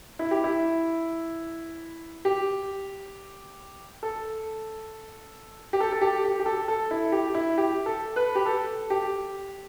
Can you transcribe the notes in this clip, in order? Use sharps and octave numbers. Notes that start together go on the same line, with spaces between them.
E4
G4
E4
G4
A4
G4
A4
A4
G4
G4
G4
A4
A4
E4
G4
E4
G4
A4
B4
G4
A4
G4